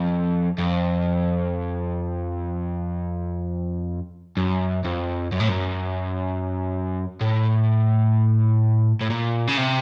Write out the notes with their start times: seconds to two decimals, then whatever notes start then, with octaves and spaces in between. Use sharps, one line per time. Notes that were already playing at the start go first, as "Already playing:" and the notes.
Already playing: F2
0.58 F2
4.37 F#2
4.85 F2
5.32 F#2
5.40 A2
5.48 F#2
7.21 A2
9.01 A2
9.10 A#2
9.48 C#3
9.58 C3